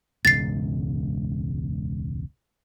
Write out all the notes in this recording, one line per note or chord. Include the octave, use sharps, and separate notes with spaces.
E1 C#2 G#2 A6 C7